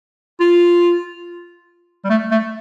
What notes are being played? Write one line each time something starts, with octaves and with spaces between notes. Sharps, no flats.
F4
G3
A3
A3